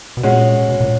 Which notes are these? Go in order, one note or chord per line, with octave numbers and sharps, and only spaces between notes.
B2
A#2 G#3 C#4 F#4
B2
A#2